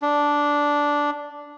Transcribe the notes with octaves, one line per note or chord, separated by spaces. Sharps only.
D4